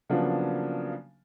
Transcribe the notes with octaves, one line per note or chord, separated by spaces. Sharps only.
C#3 F3 F#3 A#3 B3 D4